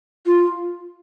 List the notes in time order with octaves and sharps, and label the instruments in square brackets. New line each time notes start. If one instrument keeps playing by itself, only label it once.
[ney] F4